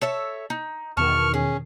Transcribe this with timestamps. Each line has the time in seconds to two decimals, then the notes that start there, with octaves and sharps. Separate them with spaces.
0.01 A4 C#5 E5
0.50 D#4
0.97 E2 B2 D#3 A5 C#6 F6
1.34 C#4 G#4